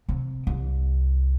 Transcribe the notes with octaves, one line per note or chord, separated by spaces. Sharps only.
C3
C2